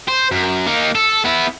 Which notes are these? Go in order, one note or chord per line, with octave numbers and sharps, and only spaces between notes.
C5
F#2
A#3 D#4
A4
B3 E4